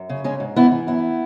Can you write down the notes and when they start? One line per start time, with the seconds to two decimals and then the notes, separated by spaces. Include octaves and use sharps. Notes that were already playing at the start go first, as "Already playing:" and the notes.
Already playing: F#2
0.09 C#3
0.24 G#2 G#3 C#4
0.40 G#2
0.56 E3 B3 E4
0.72 E3
0.87 F#2 B3 E4